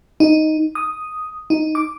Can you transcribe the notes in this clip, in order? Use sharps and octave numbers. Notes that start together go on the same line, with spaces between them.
D#4
D#6
D#4
D6